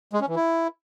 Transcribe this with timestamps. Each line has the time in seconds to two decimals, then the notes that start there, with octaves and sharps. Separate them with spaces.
0.13 G#3
0.21 C#4
0.28 E3
0.36 E4